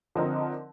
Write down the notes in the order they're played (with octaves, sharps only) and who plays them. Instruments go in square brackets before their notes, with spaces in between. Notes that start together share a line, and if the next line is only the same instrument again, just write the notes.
[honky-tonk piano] D3 F3 C4 D#4 A#4